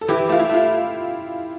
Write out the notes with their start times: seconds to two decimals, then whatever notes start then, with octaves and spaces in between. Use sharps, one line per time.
0.01 A4
0.08 E3 E4 G4
0.29 A3 F4
0.39 E4
0.49 A3 F4